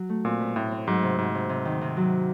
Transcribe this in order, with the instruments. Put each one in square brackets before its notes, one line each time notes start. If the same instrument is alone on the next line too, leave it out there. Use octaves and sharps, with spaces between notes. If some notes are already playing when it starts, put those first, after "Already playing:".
Already playing: [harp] F#3
A3
[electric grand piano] A#2 [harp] C4
[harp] B2
[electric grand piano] A2 [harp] C4
[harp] C4
[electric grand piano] G#2 [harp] F#3
[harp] C3
[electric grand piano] G#2 [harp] C3
[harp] C3
C3
D#3
C3
F#3